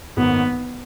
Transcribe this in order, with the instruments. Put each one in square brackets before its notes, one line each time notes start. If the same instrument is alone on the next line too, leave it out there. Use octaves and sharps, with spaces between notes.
[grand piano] G#1 F#2 D#3 A#3 [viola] B3